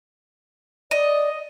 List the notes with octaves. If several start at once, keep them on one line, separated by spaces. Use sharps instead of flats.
D5 D#5